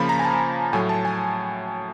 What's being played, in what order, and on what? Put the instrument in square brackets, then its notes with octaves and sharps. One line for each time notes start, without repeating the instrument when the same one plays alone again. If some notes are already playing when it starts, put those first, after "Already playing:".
Already playing: [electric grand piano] C#3 F3 A#3 B5
A#5
G#5
A5
A2 F#3 A3 G#5
A5
G#5